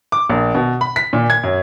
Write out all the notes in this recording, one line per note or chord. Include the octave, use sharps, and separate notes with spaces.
D6
A#1
B2
B5
B6
A#2
G#6
F#2